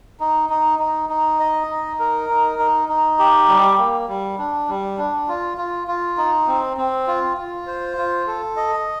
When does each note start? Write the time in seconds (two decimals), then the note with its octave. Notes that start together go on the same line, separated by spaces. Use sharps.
0.20 D#4
0.49 D#4
0.79 D#4
1.09 D#4
1.39 D#5
1.69 D#4
1.99 A#4
2.29 D#4
2.59 D#4
2.89 D#4
3.19 G4
3.48 G3
3.78 A#3
4.08 G3
4.38 D4
4.68 G3
4.98 D4
5.28 F4
5.58 F4
5.88 F4
6.18 D#4
6.48 C4
6.77 C4
7.07 F4
7.37 F4
7.67 C5
7.97 F4
8.27 A4
8.57 D#5